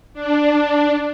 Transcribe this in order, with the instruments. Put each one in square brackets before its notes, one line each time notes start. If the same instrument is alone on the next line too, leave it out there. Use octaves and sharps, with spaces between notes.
[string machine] D4